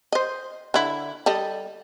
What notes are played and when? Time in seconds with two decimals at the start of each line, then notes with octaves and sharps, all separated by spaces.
0.12 C5 D#5
0.74 D3 E4
1.26 G3 A4 D#5